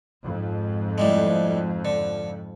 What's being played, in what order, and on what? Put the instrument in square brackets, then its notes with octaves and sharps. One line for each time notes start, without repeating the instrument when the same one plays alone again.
[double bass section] F2 G#2
[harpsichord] A2 G3 G#3
D3